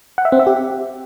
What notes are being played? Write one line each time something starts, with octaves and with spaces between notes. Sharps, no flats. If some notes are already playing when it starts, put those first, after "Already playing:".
F#5
E5
C4
E5
G4